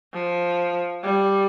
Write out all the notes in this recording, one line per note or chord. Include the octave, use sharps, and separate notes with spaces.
F3
G3